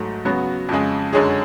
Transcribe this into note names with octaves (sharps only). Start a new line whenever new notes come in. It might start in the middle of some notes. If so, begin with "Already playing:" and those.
Already playing: G#2 F#3 A3
C#3 F#3 B3 F#4
F2 C#3 G#3
F#2 D3 G#3 C#4 G#4